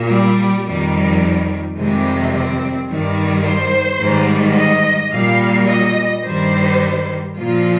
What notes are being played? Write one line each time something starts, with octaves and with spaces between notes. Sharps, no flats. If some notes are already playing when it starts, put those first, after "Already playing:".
Already playing: A#2
G3
F2 D#3 G3
F2 C3 D#3 G3 G#3
C4
G2 D#3 G3
C5
G#2 D#3 G3
D#5
A#2 G3 F5
D#5
G2 D#3 G3 C5
A#2 F3 F4